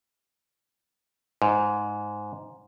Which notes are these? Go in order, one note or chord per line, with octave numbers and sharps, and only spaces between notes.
G#2